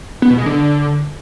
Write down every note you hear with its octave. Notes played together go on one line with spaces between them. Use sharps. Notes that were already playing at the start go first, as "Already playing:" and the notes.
B3
B2
G#3
D3